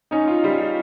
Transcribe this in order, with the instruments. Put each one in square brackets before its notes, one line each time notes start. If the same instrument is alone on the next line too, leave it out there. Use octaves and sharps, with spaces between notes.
[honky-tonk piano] C#4 [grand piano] D#4
[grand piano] F4
[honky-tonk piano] G3 [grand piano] F4
[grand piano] F4